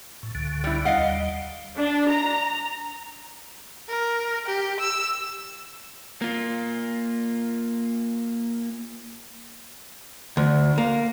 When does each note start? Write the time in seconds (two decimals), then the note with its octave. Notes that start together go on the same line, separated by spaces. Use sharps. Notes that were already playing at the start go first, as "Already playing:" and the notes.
0.23 A2
0.35 C#2 D3
0.64 G3 E4
0.85 D#2 G3 D#5 F5 F#5
1.77 D4
2.09 A#5
3.89 A#4
4.46 G4
4.80 E6
6.22 A#3 F4
10.37 D2
10.78 A#3